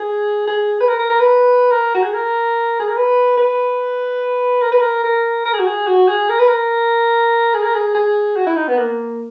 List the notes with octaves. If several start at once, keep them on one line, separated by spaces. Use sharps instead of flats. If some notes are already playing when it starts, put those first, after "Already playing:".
Already playing: G#4
G#4
B4
A#4
A#4
A#4
B4
A#4
F#4
G#4
A#4
G#4
A#4
B4
B4
A#4
B4
A#4
A#4
A#4
G#4
F#4
G#4
F#4
G#4
A#4
B4
A#4
G#4
A#4
G#4
G#4
F#4
E4
D#4
B3
A#3